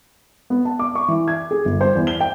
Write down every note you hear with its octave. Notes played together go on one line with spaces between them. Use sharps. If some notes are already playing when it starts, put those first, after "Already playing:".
B3
A5
D6
C#6
E3
G#6
G#4
G1
C5
E2
G7
G5